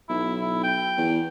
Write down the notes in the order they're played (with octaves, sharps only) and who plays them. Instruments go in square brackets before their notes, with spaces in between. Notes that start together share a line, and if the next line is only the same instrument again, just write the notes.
[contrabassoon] B1 [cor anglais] E4
[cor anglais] E4
G5
[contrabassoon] E2